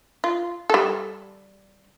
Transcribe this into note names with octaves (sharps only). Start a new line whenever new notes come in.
F4
G3 A4